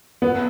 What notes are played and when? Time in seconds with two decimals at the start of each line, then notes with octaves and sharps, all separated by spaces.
0.22 B3